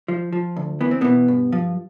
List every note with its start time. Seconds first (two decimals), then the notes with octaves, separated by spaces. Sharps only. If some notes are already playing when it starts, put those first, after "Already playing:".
0.08 F3
0.33 F3
0.56 D2
0.81 E3 B3
0.91 C4
1.01 B2 E3 B3
1.28 G2
1.52 F3